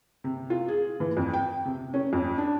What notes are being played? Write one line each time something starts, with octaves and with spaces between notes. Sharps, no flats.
C3
F4
G#4
E3
F2
G5
C3
C#4
F2
D4